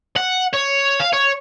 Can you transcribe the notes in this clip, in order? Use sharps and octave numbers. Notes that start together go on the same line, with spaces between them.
F#5
C#5
F5
C#5